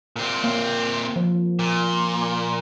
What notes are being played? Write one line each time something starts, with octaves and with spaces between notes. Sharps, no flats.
A#2 C4
A#3
F3
A#2